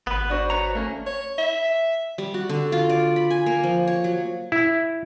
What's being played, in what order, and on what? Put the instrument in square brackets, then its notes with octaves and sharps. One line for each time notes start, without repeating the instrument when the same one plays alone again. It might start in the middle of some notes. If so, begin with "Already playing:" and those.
[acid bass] G#1 [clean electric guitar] B3 B4
[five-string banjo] D4 F#4 C5
[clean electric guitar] B4 C#5 A#5
A3 A#3 C#4
[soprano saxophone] C#5
E5
[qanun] G3
F#4
D3
F4
D5
B5
G#5
A#3
F3
C#5
F#3
[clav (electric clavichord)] E4